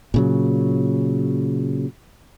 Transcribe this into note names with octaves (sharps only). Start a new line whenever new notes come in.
A#2 C#3 F#3